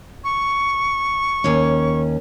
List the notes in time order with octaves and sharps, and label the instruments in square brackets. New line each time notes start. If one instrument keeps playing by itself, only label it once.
[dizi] C#6
[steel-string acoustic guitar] D#2 C#4